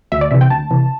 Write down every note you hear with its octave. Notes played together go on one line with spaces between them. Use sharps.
D2 E5
D5
C3 E3 E5
G5
D2 A5
C3 E3